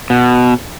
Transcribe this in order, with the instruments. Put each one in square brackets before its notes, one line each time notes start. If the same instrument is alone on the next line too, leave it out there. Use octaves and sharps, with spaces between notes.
[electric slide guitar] B2